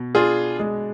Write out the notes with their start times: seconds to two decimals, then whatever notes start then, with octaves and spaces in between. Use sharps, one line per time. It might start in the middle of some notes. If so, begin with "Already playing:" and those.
Already playing: B2
0.15 D4 F4 G#4
0.59 G#3